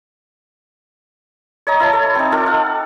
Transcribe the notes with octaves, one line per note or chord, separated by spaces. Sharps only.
C#5 D#5 A#5
E4 C#5 A5
A4
C4 D#4
D#4 F4 A4 D6
F5 F#5